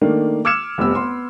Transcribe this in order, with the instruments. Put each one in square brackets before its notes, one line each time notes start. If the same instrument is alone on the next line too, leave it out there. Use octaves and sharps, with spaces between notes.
[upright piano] D#3 A3 A#3 D4
D6 E6 F6 G#6 C#7 E7
F1 G3 B3 E6
B3 C6